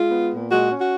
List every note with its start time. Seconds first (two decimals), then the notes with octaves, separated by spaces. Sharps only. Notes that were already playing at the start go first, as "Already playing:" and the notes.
Already playing: G#3 F4
0.10 B3
0.31 A#2
0.51 G#3 F#4
0.71 C#4
0.81 F#4